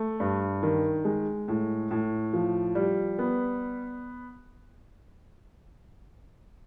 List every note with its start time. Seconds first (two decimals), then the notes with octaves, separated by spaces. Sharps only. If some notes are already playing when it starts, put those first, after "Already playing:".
Already playing: A3
0.20 G2
0.63 D#3
1.05 G#3
1.48 A2
1.91 A2
2.33 F3
2.75 G3
3.19 B3